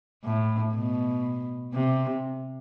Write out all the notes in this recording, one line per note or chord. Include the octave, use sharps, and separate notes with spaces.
A2
B2
C3